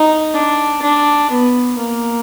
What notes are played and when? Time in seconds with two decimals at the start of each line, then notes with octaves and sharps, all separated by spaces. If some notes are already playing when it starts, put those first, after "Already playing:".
Already playing: D#4
0.34 D4
0.82 D4
1.31 B3
1.78 A#3